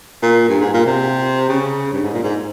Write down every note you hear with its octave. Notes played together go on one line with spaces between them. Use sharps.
A#2
G2
G#2
A#2
C3
C#3
G2
G#2
A#2
G#2